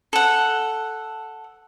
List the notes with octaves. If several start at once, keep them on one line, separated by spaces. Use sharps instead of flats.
A4 F#5